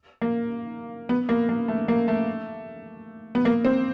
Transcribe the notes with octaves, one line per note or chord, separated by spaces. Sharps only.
A#3
B3
A#3
A#3
A3
A#3
A3
B3
A#3
C4